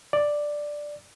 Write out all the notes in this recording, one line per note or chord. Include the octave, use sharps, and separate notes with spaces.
D5